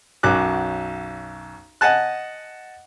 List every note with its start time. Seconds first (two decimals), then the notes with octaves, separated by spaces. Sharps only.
0.23 B1 F#2 F#4 D6 F#6
1.81 D#5 F#5 G#5 A5 F#6